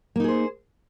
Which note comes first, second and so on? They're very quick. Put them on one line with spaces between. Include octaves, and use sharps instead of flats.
A#3 D#4 G#4 C5